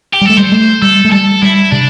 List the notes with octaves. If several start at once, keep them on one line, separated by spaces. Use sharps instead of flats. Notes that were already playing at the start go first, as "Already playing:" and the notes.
G4
G3
A3 A4
G3 C5
A3
G3 A4
A3
G3 A4
G3 E4
C3 D4